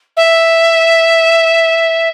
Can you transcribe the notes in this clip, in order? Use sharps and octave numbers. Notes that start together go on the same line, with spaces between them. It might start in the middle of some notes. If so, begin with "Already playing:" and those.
E5